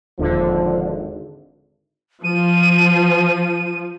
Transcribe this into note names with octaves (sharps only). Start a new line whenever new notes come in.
D#1 G#1 D3 F3
F3 D#7